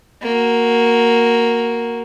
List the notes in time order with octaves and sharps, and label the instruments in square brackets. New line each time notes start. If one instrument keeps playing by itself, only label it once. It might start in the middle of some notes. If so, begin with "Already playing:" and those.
[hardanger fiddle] A#3 F#4